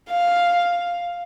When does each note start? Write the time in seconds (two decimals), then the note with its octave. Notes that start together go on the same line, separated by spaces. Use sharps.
0.10 F5